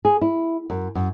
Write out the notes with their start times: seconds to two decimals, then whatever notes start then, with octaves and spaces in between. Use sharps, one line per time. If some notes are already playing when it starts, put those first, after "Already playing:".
0.05 G#4
0.21 E4
0.70 F#2
0.95 F#2